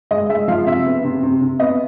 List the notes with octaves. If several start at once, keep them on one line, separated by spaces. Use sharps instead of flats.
G#3 D#5
G#3 E5
F3 F5
C3 E5
B3
C3
C3
C3
B3 D#5